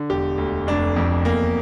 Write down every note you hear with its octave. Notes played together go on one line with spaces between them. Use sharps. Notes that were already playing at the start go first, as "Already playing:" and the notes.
Already playing: D3
E1 G4
D2
F1 D4
F2
E2 A#3